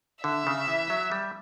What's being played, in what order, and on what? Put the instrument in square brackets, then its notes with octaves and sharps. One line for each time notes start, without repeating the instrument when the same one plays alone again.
[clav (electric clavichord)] D3 [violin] E5
[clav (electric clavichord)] C#3
E3
F#3
G3